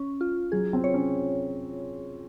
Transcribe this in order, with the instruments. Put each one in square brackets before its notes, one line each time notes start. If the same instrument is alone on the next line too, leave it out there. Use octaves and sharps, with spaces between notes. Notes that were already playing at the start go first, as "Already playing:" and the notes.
Already playing: [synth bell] C#4
F4
[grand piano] F#3 [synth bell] G#4
[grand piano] C4
[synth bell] C#5
[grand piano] C#4